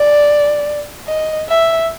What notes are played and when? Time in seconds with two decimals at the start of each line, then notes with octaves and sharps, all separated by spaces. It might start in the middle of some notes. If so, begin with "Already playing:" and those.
Already playing: D5
1.07 D#5
1.48 E5